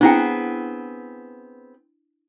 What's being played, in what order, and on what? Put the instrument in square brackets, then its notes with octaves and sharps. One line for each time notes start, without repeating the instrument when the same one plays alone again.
[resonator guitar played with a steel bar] B3 C4 G#4 [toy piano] D4 E4 G5